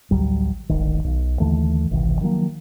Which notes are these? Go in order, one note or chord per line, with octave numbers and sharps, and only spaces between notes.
A1 D2 F#3 G3
D1 G#1 D#3
B1
D#2 D3 E3 A3
G#1 C#2 C3 E3
D#3 F3 F#3 A#3